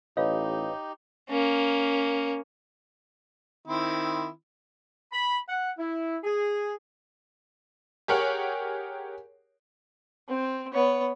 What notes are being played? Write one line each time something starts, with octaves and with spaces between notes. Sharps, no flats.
A1 D#4 G4 B4 C#5 D#5 F5
A#3 C#4
D#3 C4 E4
B5
F#5
E4
G#4
G4 G#4 A#4 C#5 F#5
C4
B3 C#5